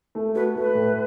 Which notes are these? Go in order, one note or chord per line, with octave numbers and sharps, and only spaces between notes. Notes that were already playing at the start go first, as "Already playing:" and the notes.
A3
F#4 B4
A3 B4
A2